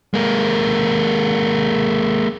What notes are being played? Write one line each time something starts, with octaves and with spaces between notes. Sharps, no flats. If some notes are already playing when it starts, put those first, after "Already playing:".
G#3 A#3